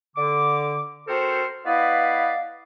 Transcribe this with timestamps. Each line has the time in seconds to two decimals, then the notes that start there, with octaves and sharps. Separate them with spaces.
0.16 D3 D6
1.08 C4 F#4 A4 A#4 C5
1.65 B3 E4 B4 D5 D#5 F5